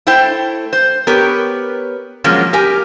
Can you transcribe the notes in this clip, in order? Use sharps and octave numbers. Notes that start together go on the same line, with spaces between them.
A3 E4 A4 C5 G5
C5
B3 G4 A#4 B4 C#5
B2 F3 F#3 G#3 A#3 C#4
G4 A#4 G#5